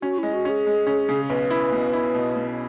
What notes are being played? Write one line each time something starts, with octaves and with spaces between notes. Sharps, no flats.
C#4 F#4
G#3 E4
F#4
C#4 G#4
G#3
C#4
C#3
B1 B4
E4
B2
E4
B2
B2